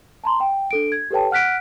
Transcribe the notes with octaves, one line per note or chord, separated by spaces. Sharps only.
A5 A#5 C6
G5
D4 A4 D7
G#6
G4 A4 B4 C#5 G5 A5
F#5 F6 F#6 B6 D7